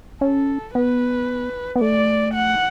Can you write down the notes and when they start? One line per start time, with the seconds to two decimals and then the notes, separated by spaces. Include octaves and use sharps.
0.21 C#4 A4
0.75 B3 B4
1.76 B3
1.81 A3 D5
2.35 F#5